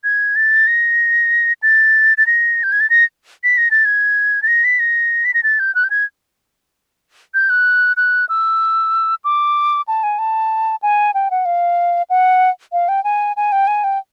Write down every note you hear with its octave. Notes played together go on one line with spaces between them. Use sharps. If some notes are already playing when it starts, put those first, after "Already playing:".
G#6
A6
A#6
A6
A6
A#6
G6
G#6
A6
A#6
B6
A#6
A6
G#6
A6
A#6
B6
A#6
B6
A#6
A6
G6
F#6
G6
G#6
G6
F#6
F#6
E6
D6
A5
G#5
A5
G#5
G5
F#5
F5
F#5
F5
G5
G#5
G#5
G5
G#5
G5